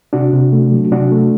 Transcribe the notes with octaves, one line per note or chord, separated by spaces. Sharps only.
C3 D4 F#4
C3
A3
F#3
C3 D4 F#4
A3